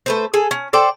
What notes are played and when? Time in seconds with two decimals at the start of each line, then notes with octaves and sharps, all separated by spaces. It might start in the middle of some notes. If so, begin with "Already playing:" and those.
0.06 A3 B4 C5
0.34 G#4 A4
0.51 C#4
0.73 A4 C5 D5 G5